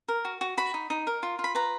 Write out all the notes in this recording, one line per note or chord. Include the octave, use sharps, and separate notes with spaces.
A#4
F#4
F#4
F#4 B5
D#4
D#4
A#4
F4
F4
B5
B4 A#5